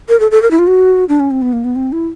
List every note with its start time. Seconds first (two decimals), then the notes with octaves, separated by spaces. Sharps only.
0.09 A#4
0.20 A4
0.31 A4
0.42 A#4
0.51 E4
0.59 F4
0.67 F#4
1.09 D4
1.20 C#4
1.31 C4
1.42 B3
1.53 A#3
1.64 B3
1.76 C4
1.92 E4